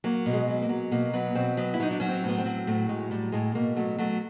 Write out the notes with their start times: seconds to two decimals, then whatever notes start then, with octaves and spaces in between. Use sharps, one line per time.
0.04 F#3 A#3
0.26 B2
0.33 G#3
0.48 F#3
0.62 A#3
0.69 F#3
0.91 B2 A#3
1.13 F#3 B3
1.35 B2 C4
1.57 F#3 B3
1.74 E4
1.80 F#3 D#4
1.91 D4
2.00 F#3 C#4
2.09 C4
2.23 A2
2.28 B3
2.38 C4
2.45 F#3
2.67 A2 A3
2.89 F#3 G#3
3.11 A2 G3
3.32 A2 G#3
3.55 B2 A#3
3.76 F#3 A3
3.98 F#3 A3